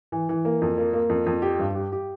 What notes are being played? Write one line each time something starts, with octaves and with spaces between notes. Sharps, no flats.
E3
E3
A#3
F2
A#3
A#3
F2
F2
G4
G2
G4
G4